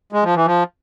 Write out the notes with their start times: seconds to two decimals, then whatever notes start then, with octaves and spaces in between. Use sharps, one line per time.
0.13 G#3
0.23 F3
0.35 E3
0.46 F3